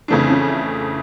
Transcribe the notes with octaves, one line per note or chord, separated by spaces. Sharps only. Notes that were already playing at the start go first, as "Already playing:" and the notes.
F2 C#3 E3 A3 C4 D4
C#4